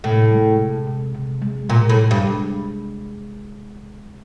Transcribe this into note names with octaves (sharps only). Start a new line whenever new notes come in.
A2 C3
G#3
C3
C3
C3
G#3
A#2 G#3
A2
G#3
G2
G#3